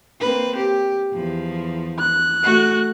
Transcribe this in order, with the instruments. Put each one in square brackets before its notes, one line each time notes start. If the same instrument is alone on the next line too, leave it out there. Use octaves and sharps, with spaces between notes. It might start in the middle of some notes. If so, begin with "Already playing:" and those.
[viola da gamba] A#3 C4 B4
G4
E2 F3
[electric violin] F#6
[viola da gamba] A3 F#4